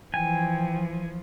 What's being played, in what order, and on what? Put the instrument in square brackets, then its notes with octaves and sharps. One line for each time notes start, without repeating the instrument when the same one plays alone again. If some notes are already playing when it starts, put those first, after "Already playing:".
[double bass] E3 [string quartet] F3 [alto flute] G5 [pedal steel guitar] G#5